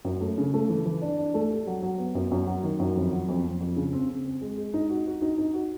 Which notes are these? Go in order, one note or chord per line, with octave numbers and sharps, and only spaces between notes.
F#2
A3
C#3
A3
E3
E3
D4
D4
A3
G4
F#3
F#3
B3
F#2
F#2
F#3
D#3
F#2
F2
F#3
F2
F2
F2
C#3
C4
C4
C4
G#3
G#3
D#4
F#4
F#4
D#4
D#4
F#4